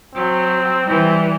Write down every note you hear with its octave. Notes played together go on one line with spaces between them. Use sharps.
F#3 C4
E3 G3